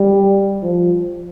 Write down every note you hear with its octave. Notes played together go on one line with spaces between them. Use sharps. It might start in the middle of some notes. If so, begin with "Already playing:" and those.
Already playing: G3
F3